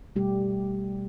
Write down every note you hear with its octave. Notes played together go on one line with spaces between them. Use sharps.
B2 G3 A3 G4